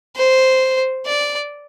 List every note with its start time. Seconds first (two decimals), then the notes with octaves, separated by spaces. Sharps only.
0.16 C5
1.06 D5